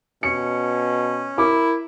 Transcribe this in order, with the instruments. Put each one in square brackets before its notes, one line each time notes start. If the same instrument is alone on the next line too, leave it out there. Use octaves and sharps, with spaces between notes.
[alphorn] B2 [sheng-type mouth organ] C#4 [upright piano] C#7
[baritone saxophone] E4 [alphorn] A#4 [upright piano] D6